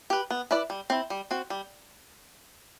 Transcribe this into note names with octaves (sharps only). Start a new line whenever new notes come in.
G4 B4
B3
E4 B4 D5
G3
C4 E4
G3
C4 F#4
G3